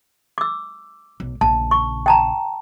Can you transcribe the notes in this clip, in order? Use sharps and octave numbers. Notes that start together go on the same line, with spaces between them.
D6 E6
B1
A#1 C#3 A5
C#6
G5 A5 A#5